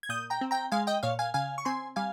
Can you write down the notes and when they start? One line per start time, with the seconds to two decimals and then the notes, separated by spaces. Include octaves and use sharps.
0.03 G#6
0.09 A#2 D#6 G6
0.30 G5 A#5
0.41 C4
0.51 G5 A#5
0.72 G#3 F5 G#5
0.87 D#5 G5
1.03 A#2 C#5 F5
1.19 F5 G#5
1.34 C#3 F5 G#5
1.58 C#6
1.65 C4 G#5 C6
1.96 G3 F5 G#5